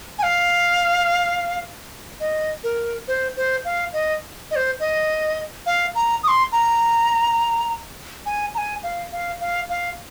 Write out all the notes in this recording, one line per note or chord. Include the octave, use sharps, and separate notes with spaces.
G#5
F5
D#5
A#4
C5
C5
F5
D#5
D#5
C5
D#5
F5
A#5
D#6
C6
A#5
G#5
A#5
G#5
F5
F5
F5
F5